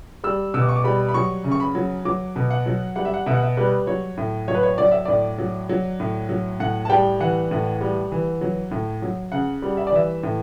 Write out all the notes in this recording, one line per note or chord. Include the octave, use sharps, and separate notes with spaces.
G3 E6
B2 E6
D6
C#6
D6
G3 B5
B5
F#3 C#6
C#3
C#6
B5
F#3
F#3 D6
B2
F#5
F#3
G3 F#5
E5
F#5
B2 E5
F#5
E5
G3 B4
F#3 C#5
A2
F#3 C#5
B4
C#5
F#3 D5
E5
A2 D5
F#3
F#3
A2
F#3
A2 F#5
A5
G3 G5
E3 F#5
A2
G3
E3
F#3
A2
F#3
C#3 F#5
G3
E5
D5
E3 E5
A2